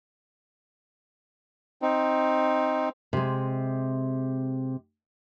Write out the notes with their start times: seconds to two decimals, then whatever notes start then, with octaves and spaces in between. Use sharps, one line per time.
1.82 C4 D#4
3.13 C3 G#3